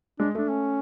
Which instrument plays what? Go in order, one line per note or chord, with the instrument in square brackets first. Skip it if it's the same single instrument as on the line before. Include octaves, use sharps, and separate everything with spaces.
[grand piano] G#3 [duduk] D4
[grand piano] A3 [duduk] D4
[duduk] C#4